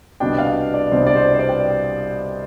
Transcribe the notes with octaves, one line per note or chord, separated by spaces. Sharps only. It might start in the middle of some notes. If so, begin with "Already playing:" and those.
C2 B2 B3 D4 G5
F5
D5
C2 B2 B3 D4 C5
D5
C5
C5
D5
G5